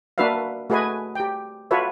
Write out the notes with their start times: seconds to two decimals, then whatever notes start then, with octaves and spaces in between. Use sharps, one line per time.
0.18 A#3 D4 F#4 B4 E5 F5
0.70 A3 F#4 G#4 B4 D#5 G#5
1.15 G4 G5
1.71 F4 F#4 A4 B4 C#5 E5